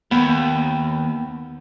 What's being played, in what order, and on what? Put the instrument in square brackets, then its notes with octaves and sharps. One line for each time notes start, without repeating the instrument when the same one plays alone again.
[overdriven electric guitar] D#2 [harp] B3